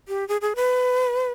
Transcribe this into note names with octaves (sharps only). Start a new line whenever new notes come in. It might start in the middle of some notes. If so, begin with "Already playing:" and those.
G4
G#4
G#4
B4